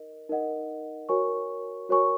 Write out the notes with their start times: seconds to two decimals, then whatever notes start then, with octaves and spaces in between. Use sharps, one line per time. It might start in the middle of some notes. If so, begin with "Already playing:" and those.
Already playing: D#4 A#4 D#5
0.29 D#4 A#4 D#5 F#5
1.09 F#4 A#4 C#5 G#5 C#6
1.89 F#4 A#4 C#5 G#5 C#6